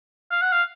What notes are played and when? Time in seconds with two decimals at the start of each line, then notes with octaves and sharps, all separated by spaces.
0.31 F5
0.42 F#5
0.52 F5